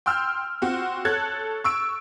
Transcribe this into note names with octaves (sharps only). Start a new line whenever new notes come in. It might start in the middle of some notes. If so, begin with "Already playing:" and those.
G5 C6 E6 F6 G6
C4 F4 F#4
A4 C#5 A5 F#6 G#6 A6
C#6 E6 D7